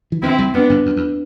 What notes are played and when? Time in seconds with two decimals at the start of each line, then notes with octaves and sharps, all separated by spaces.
0.12 E3
0.22 D2 D3 C4 E4
0.38 C2 C3
0.54 F2 B3 D4
0.70 G1 G2
0.86 F2
0.96 E2